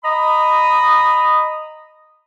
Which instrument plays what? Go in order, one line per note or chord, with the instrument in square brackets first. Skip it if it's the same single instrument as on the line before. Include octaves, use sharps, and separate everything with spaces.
[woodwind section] D#5 A#5 B5 D#6